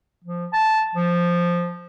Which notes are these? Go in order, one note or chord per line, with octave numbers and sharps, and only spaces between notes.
F3
A5
F3